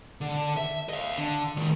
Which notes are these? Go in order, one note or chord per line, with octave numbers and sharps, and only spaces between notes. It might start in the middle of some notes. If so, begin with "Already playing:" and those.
D3
E5
D#5 F5
D3
A2 D#3